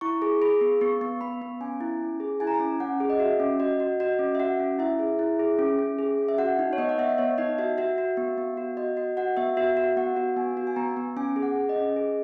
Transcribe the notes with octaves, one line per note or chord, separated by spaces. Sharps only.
E4 C#6
G#4
G#4 B5
B3
B3 C#6
B3
B3 B5
B3
C#4 G#5
E4
C#4
G#4
E4 G#5
A#5
G#5
C#4
C#4 F#5
G#4
D#5
F#4 E5
C#4
F#4 D#5
F#4
F#4 D#5
C#4
E5
F#4 F#5
C#4
E4 E5
G#4
E4
G#4
C#4
C#4
G#4
C#4
E5
F#4 F#5
D#4
C#5
B3 D#5
F#5
B3 E5
D#5
B3 C#5
D#4 D#5
F#4 E5
F#4 E5
F#4
B3
B3
F#4
F#4 D#5
F#4 D#5
F#4 F#5
B3 E5
F#4 E5
F#4
B3 F#5
F#4
B3 G#5
F#4
G#5
B3 A#5
B3
C#4 G#5
G#4
F#5
G#4
D#5
C#4
G#4